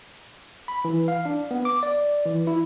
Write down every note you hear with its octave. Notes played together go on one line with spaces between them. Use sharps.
B5
E3
F5
D4
B3
D6
D5
E3
E4